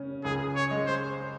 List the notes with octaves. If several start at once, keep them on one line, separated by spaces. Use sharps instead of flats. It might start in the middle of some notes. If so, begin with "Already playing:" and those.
Already playing: C#3 C#4
C#2 G#4
C#5
G#3
C5